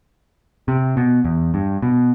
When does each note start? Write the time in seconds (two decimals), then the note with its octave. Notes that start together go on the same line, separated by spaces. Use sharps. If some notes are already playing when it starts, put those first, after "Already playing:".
0.68 C3
0.97 B2
1.25 E2
1.54 G2
1.82 B2